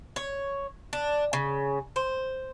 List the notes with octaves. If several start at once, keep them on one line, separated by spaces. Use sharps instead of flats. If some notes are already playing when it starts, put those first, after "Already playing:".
C#5
D4
C#3
C5